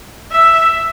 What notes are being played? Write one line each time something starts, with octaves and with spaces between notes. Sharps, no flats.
E5